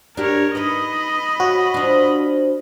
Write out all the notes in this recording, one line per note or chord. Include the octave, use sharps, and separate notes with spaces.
D4 G4 A#4 C#5
D#4 B4 D#5 B5
C#4 F#4
F3 D4